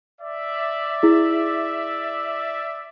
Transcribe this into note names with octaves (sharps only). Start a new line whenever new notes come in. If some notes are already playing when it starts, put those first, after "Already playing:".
D5 E5
E4 G#4